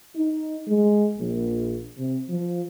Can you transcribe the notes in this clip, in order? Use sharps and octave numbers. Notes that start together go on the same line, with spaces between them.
D#4
G#3
A#1
C3
F3